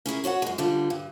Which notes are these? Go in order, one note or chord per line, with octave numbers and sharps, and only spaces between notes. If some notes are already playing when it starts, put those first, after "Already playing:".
C#4 E4 G#4 A#4
F#4 C#5 D5 F#5
F#2 G#3
D2 D3 F3 G3
G2